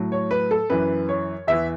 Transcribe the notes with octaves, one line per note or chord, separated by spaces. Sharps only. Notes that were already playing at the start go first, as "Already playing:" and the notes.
Already playing: A2 F#3
C#5
B4
A4
F#2 E3 B4
C#5
E2 E3 E5